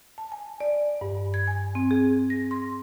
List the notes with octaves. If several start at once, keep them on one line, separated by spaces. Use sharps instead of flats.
A5
G#5
D5
G2
G#6
G#5
C4
G#4
A#6
C6